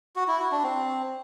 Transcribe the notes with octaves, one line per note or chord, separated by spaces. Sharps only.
F#4
E4
F#4
D4
C4